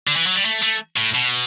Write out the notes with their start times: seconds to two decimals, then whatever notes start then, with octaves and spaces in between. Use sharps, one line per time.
0.07 D3
0.16 E3
0.26 F#3
0.35 G3
0.45 A3
0.62 A3
0.97 A2
1.15 B2